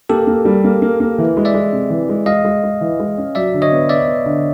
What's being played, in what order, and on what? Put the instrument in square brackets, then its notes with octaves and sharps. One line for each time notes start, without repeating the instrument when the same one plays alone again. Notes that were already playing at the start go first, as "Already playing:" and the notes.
[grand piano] A#3 [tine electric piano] G4 A4
[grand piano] A#3
G3
A#3
A#3
A#3
E3
G#3
[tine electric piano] D5 E5
[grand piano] G#3
C3
E3
G#3
[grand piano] G#3 [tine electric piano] D#5 F5
[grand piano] G#3
G#3
E3
G#3
C#4
[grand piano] F#3 [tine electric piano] D5 E5
[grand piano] D3
[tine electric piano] C#5 D#5
[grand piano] B3
[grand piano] B3 [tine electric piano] D5 E5
[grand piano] B3
D3